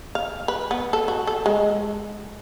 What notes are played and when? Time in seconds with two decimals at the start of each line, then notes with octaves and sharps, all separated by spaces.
0.15 F5
0.48 B4
0.71 B3
0.93 A4
1.08 F#4
1.27 A4
1.46 G#3